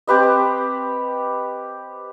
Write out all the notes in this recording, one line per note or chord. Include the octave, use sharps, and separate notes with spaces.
C4 G4 B4 D#5